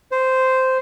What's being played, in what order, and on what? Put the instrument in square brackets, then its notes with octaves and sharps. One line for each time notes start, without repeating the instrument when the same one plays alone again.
[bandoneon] C5